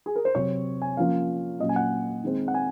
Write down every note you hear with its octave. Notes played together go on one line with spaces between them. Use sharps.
G#4
A#4
C5
C3 F#3 C4 C#5
G#5
F3 A#3 C#4 F5
A#2 F#3 C#4 D#5
G#5
F#5
D#3 G#3 C4
F#5
G#5